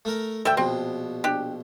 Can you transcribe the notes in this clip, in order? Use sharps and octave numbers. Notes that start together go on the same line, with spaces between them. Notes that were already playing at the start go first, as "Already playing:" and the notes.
A3 A#4
D2 A4 E5 G5
A#1 B2 C4
D4 G4